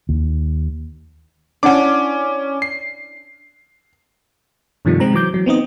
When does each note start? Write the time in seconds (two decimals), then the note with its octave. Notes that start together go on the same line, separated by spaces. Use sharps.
0.09 D#2
1.63 C#4 D4 E4 F#5 D6
2.62 C7
4.85 G2 C3 D#3 F3 G3 A3
5.00 C3 G#3 C4 A#5
5.13 E3 F#3 D6 G6
5.34 E3 F#3
5.46 B3 C4 D#4 D#5